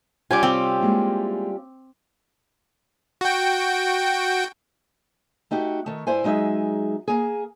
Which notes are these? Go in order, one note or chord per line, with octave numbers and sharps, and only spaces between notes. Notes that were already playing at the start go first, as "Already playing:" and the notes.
G3 C#4 F4 G#5 D6
C3 C4 G4
G#3 A#3 E4
F#4 G5
A3 D#4 F#4 G4
D#3 A3
G2 E4 C5 G#5
F#3 G#3 D#4 G#4 E5
A#3 G#4